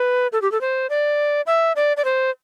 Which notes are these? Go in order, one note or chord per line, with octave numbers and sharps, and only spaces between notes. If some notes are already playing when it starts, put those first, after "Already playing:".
Already playing: B4
A4
G4
A4
C5
D5
E5
D5
D5
C5